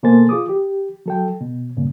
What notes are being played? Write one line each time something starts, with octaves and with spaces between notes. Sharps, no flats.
B2 A#3 A4 C5 G#5 A6
F4 G#4 D6 D#6
G4
F#3 A4 G5
B2
G2 A#2 C#3